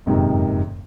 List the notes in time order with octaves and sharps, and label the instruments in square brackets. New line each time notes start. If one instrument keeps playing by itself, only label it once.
[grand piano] F#1 F2 G#2 C3 D#3